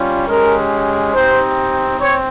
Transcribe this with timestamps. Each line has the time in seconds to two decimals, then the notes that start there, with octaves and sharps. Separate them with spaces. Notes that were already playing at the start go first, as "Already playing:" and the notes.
Already playing: G3 C#4 F4
0.27 G#3 C#4 G4 A#4
1.13 C4 D#4 G4 C5
1.99 C4 C#5